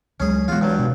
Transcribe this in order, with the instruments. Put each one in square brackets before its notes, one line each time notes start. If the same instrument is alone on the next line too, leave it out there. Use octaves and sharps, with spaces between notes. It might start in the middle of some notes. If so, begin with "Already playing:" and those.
[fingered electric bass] C#2 F#3 G#3 [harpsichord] C#4 G#4
[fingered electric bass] E3 G#3 B3 [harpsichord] F4 F#4
[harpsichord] G2 F#3
[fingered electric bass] B2